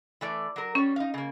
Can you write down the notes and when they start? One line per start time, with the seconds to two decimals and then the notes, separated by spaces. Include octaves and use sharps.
0.21 E3 A3 D5
0.56 F#3 A#4
0.75 G3 C#4 C#5
0.96 D#4 F5
1.14 C#3 A#3